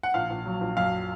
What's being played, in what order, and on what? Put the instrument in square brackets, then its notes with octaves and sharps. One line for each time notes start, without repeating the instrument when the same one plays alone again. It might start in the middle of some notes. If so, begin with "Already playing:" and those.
[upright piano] F#5
A#1 F5
A#1
F#3
A#1
F#2 F5